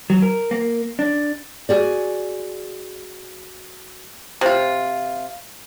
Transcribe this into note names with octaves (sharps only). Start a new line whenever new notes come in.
F#3
A#4
A#3
D4
F#4 G#4 D5
C3 F4